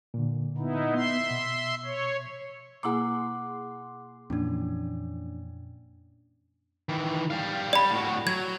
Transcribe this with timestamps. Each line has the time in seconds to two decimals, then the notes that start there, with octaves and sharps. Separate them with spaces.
0.14 A#2 D3
0.58 B3 D#4 E4
0.94 B3 E5 C6
1.30 B2
1.85 C#5
2.83 B2 A#3 E4 G#4 F#5 C6 D6
4.30 F2 A#2 E3 C#4 D4
6.89 D#3 E3
7.30 G3 F5
7.73 D5 B5
7.92 A2 F#4
8.27 F#3 G#6